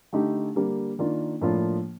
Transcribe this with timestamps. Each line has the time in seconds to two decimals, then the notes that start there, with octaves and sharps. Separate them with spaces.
0.13 D3 A3 D#4 G4
0.55 D3 G3 A#3
0.99 D#3 A#3 D4 F4
1.41 A2 F3 A#3 D4 F4